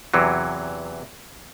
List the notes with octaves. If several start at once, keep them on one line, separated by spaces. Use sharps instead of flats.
E2 C3 E3 F#3